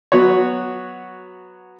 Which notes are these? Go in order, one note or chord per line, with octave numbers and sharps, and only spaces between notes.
F#3 B3 F#4 C#5